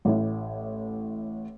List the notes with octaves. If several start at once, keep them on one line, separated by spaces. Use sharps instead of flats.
A1 A2